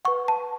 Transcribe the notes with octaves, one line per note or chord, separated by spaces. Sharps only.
B4 F#5 C#6
A5